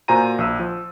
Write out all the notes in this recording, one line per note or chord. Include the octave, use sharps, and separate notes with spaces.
A#2 F#4 C5 G#5 A#5 D#7
A#1 E6
F3